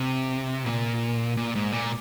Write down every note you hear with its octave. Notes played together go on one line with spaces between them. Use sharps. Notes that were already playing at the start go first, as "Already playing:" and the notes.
Already playing: C3
A#2
A#2
G#2
A#2